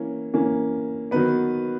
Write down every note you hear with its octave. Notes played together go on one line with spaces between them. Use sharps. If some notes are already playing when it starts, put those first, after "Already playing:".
Already playing: E3 A#3 C#4
E3 A#3 C#4
D#3 F#3 B3 B4